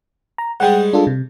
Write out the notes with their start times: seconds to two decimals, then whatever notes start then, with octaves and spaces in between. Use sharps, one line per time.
0.38 A#5
0.60 G#2 G3 G#3 F#5 G5
0.93 D4 F4 A4
1.07 C3